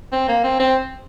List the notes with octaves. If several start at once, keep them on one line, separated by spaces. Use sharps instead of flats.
C4
A#3
C4
C4